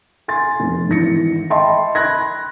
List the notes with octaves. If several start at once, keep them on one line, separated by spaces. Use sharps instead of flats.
G#5 C6 A6
F1
G#1 E3 A#6 C#7
D#5 E5 G5 A5 B5 C6
B5 C6 F#6 G#6 A#6